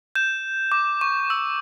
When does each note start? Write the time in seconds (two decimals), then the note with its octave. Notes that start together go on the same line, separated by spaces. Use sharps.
0.15 G6 E7
0.72 D6
1.01 C#6
1.30 E6